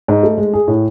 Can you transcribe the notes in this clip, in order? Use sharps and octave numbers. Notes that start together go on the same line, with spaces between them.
G#2
A3
G#3
G#4
A2